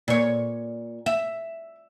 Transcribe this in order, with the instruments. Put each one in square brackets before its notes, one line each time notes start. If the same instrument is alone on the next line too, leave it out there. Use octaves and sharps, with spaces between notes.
[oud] A#2 C#5
E5